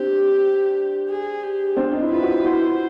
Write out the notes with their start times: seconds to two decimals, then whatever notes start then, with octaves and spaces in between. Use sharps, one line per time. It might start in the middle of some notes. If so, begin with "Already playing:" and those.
Already playing: C4 D4 G4
1.09 G#4
1.43 G4
1.77 C4 D4 F4
1.92 D#4
2.03 E4
2.11 F4 B4
2.22 E4 F#4
2.45 E4 F#4 C5